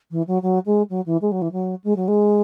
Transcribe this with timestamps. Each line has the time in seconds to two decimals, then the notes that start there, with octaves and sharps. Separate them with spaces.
0.11 E3
0.27 F#3
0.42 F#3
0.66 G#3
0.90 F#3
1.06 E3
1.21 G#3
1.32 F#3
1.42 E3
1.52 F#3
1.84 G#3
1.96 F#3
2.08 G#3